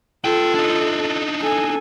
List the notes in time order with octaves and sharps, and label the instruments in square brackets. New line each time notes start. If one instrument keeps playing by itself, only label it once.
[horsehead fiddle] F4 A4 [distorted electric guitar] B4 G5
[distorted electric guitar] D4 D#4
[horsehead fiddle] A4 G#5